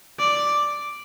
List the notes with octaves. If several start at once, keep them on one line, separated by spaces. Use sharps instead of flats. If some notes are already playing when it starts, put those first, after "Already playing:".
D5